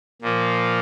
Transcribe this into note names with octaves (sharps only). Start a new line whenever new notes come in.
A#2 F3 A#3